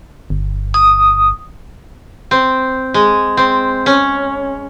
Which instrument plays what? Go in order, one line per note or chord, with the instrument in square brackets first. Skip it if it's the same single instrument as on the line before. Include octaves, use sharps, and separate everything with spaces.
[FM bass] G1
[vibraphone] D#6
[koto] C4
G#3
C4
C#4